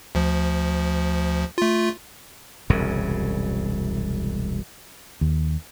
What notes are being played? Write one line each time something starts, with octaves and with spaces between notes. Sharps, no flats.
D2 F3
A3 F4
E1 C2 F#2 C#3
D#2